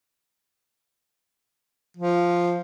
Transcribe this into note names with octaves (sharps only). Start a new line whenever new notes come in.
F3